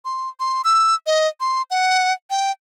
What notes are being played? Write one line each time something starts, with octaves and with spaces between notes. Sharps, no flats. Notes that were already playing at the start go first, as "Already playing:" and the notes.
C6
C6
E6
D#5
C6
F#5
G5